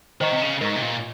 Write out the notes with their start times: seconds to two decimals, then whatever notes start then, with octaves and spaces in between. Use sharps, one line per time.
0.21 D#3 C5 D#5 A#5 C#6
0.33 C3
0.42 C#3
0.61 G#2 A#4 D#5 A#5 C#6
0.76 C3
0.82 A#2